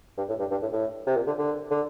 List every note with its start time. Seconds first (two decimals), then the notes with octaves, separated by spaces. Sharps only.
0.17 G2
0.29 A2
0.39 G2
0.51 G2
0.62 A2
0.72 A2
1.07 C3
1.16 A#2
1.27 D3
1.38 D3
1.71 D3